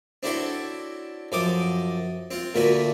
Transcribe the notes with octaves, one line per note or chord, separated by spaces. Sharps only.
C4 D4 E4 F#4 A4 C#5
F#2 F3 A4 D#5 D6 D#6
C4 F4
D2 A#2 A3 A#3 F#4 B4